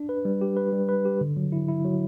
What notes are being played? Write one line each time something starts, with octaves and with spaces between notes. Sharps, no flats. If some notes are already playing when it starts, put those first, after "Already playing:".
Already playing: D4
B4
G3
G4
B4
G3
B4
G4
D3
F#3
E4
E4
F#3